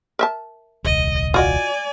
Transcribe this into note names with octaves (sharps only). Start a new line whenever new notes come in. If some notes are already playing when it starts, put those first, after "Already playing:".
A#4 E5 A5
D#1 C2 D#5
F4 F#4 D5 D#5 G#5